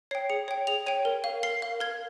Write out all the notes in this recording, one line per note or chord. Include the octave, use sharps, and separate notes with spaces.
C#5 G5 C7
G#4 C#7
C#5 G5
G#4 F7
C#5 G5 D#7
A#4
F5
A#4 C7
F5
A#4 G#6